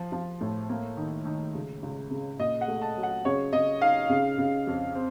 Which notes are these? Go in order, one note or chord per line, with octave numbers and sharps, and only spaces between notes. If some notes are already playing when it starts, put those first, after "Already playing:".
Already playing: F3
F3
A2
A#3
D#3
D#3
C#2
C#2
C#3
A#2 D#5
F#5
A3
A5
F#3
F#5
C#3 C#5
C#3 D#5
D#4 F5
C#3
C#3
F2
C4